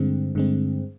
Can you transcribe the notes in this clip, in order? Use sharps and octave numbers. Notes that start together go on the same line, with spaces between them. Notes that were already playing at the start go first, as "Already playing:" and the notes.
Already playing: G2 D3 G#3 C4
G2 D3 G#3 C4